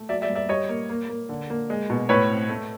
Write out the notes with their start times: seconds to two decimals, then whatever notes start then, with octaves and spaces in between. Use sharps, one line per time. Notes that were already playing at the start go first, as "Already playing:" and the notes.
Already playing: A3
0.09 F#3 D5 E5
0.22 D5 E5
0.30 G2
0.35 D5 E5
0.49 G3 C#5 D#5
0.69 A#3
0.89 A#3
1.09 A#3
1.29 D3
1.50 A#3
1.70 G#3
1.90 B2
2.09 A2 B4 C#5
2.30 C4
2.49 A3